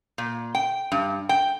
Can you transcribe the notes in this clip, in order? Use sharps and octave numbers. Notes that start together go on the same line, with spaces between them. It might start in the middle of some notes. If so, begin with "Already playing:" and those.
A#2
G5
G2
G5